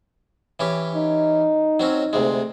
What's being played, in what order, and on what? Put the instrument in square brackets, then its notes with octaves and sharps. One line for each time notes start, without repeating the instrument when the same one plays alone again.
[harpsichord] E3 C#4 G4
[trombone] D#4
[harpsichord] F#3 C4 C#4
D2 C3 G#3